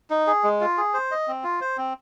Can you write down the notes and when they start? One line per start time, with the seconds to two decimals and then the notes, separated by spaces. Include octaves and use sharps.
0.10 D#4
0.27 G#4
0.44 G#3
0.61 F4
0.78 G#4
0.94 C5
1.11 D#5
1.28 C4
1.44 F4
1.61 C5
1.77 C4